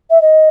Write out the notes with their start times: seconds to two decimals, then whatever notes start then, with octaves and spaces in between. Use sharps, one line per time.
0.10 E5
0.21 D#5